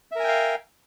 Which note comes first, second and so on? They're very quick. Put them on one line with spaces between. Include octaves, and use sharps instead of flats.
E5 A#4 G#5 G5 F5